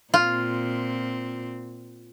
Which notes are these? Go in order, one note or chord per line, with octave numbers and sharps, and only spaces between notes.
A#2 C4 F4